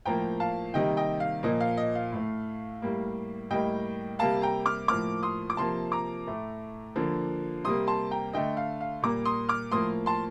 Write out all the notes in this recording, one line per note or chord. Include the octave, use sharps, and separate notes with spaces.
A2 F3 A#3 G5 A#5
F5 A5
C3 D#3 G3 A#3 D#5 G5
D#5 G5
F5
A#2 F3 A#3 D#5
F5
D#5
F5
A2 A3
A2 G3 A#3
A2 G3 A#3 D#5 G5
C3 G3 A#3 F5 A5
G5 A#5
D6 F6
A2 F3 A#3 D6 F6
C6 D#6
D6
C3 F3 A#3 A5 C6
A#5 D6
A2 A3
D3 F3 A#3
C3 G3 A#3 C6 D#6
A5 C6
G5 A#5
D3 A3 D#5 G5
F5
F5
A#2 G3 A#3 A#5 D6
C6 D#6
D6 F6
A2 F3 A#3 C6 D#6
A5 C6